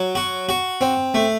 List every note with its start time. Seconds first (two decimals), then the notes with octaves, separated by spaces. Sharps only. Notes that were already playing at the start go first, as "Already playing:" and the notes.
Already playing: F#3
0.15 F#4
0.49 F#4
0.81 C4
1.14 A3